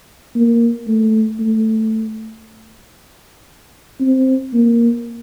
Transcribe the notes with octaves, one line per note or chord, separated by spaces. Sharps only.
A#3
A3
A3
C4
A#3